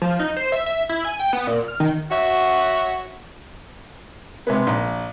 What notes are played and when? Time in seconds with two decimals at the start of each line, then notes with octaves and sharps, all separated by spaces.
0.02 F3
0.19 D#4
0.37 C5
0.52 E5
0.66 E5
0.89 E4
1.05 G#5
1.20 G5
1.33 B3
1.47 A#2
1.68 F6
1.80 D#3
2.11 F#4 C#5 E5 F#5
4.47 C3 G#3 B3
4.67 A#1